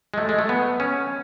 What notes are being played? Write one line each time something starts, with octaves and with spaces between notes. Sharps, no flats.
G#3
A3
G#3
A3
B3
C#4